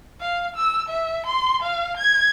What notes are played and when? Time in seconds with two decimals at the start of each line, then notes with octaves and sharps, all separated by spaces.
0.20 F5
0.56 E6
0.89 E5
1.26 C6
1.62 F5
1.97 G#6